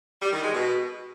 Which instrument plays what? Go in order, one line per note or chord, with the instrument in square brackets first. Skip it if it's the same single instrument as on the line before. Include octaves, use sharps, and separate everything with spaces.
[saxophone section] G3
D#3
G#3
B2